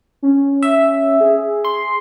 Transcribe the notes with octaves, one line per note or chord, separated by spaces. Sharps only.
C#4
E5
G#4
C6